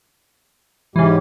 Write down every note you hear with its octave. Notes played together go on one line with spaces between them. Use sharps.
G#2 C#3 E3 G#3 G4